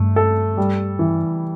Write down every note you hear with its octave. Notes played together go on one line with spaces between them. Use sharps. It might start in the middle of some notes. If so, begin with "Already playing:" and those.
Already playing: G2 A3
A4
G3
E3